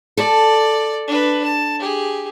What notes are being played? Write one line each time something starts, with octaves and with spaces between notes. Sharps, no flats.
A4 D5
D4 B4
A5
G4 G#4